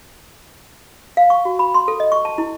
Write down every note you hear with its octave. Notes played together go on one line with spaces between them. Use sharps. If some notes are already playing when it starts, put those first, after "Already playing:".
F5
C#6
F#4
B5
C6
A4
D#5
C#6
A5
E4